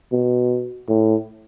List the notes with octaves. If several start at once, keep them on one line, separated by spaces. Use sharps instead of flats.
B2
A2